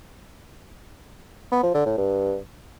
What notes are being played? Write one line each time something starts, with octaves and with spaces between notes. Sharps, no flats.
B3
F3
D3
A2
G2